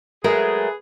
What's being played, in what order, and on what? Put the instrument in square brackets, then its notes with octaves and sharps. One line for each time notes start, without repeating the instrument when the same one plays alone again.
[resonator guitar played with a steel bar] F#3 G#3 A3 [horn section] G#4 B4 [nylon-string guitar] A#4